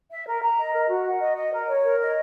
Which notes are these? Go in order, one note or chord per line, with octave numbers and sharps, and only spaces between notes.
E5
A#4
A#5
D#5
A#4
F#4
F#5
D#5
D#5
A#4
C#5
A#4
D#5